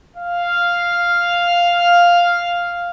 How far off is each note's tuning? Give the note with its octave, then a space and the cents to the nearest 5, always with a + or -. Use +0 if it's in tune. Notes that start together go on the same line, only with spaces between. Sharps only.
F5 +0